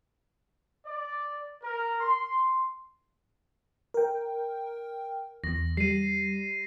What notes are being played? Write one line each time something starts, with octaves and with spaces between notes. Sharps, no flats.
D5
A#4
C6
A#4 G5
E2 A#6
G3 C7 D#7